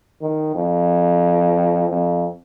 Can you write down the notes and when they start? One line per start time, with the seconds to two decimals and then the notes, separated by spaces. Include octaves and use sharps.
0.22 D#3
0.55 F2
1.90 F2